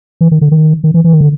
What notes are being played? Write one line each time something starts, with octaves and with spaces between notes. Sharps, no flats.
E3
D#3
D3
D#3
D#3
E3
E3
D#3
D3